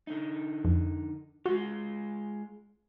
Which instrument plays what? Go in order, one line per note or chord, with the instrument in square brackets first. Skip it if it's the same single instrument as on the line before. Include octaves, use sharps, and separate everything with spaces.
[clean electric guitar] D3 D#4
[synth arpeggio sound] F2
[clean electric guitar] G#3 F4 [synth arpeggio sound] F#4